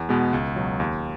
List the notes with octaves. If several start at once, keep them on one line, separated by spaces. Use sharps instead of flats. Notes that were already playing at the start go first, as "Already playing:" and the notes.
Already playing: E2
B2 G#3 B3
C#2
B2 F#3
D#2